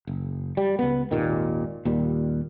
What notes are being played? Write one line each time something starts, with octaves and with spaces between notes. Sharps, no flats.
F#1
G3
C#2 B3
G#1 D#2 A#2 D#3
D#2 A#2 G3